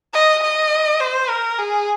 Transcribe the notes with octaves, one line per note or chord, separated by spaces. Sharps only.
D#5
D#5
C5
A#4
G#4